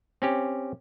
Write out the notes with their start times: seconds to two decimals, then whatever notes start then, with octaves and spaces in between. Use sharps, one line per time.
0.22 C4 C#4 G4